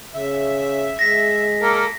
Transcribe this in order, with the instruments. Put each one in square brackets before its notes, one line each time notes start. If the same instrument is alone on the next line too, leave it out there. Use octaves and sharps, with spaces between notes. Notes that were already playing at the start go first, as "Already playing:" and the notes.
[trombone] C#3 [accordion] E5
[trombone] G#3 [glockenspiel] A#6 B6
[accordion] A#3 A4 A#4